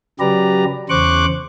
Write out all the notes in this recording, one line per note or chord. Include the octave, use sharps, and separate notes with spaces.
C#3 F#3 G4 B4 D5 A#5
E2 C#3 C5 C#6 D6 F#6